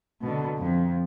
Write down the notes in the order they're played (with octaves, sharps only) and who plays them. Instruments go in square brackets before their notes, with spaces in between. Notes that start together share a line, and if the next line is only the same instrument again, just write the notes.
[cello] B2 D3
F2